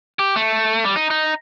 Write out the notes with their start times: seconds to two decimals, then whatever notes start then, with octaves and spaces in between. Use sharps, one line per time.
0.19 G4
0.36 A3
0.84 G3
0.96 D#4
1.10 D#4